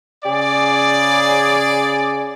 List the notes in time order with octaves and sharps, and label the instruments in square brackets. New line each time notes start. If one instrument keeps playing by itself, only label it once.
[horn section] C#3 G#4 D5